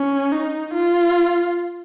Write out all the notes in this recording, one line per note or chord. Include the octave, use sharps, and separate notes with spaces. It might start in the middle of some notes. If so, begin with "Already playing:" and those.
Already playing: C#4
D#4
F4